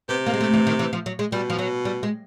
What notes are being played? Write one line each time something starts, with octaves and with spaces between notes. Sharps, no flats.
C3 B3
A#3
G#3
A3
E3
D#3
E3
F3
F#3
G#3
B2 G3
F3
F#3
G3
G#3